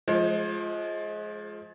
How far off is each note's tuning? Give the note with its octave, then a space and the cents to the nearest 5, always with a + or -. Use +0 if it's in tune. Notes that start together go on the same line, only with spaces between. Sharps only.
F3 +0 G#3 +25 C5 +40